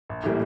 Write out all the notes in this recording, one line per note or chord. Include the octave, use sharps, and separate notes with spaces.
A#1
A2 E3 G3 A#3